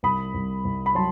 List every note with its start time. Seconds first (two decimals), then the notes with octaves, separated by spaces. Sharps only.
0.03 C2 B5 D#6
0.34 C2
0.65 C2
0.86 B5
0.95 F#3 A5 C6